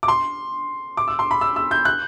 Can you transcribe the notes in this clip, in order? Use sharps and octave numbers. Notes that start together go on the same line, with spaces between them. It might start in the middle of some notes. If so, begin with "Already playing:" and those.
D6
C6
D6
E6
C6
B5
E6
E6
G6
F#6